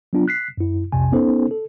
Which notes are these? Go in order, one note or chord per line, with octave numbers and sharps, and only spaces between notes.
F#3 B3 D4 F4
F#6 B6 C7
F#2 E4
B1 F2 C3 G#5
B3 C#4 D#4 A4 C5
A4